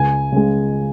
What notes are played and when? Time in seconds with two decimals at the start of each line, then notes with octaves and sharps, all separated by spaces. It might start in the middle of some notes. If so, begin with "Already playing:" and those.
Already playing: C#2 G#5
0.32 C#3 G#3